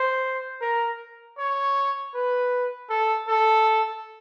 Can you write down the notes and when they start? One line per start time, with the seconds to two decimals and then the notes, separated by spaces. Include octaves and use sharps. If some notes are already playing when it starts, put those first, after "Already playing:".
Already playing: C5
0.61 A#4
1.38 C#5
2.14 B4
2.89 A4
3.28 A4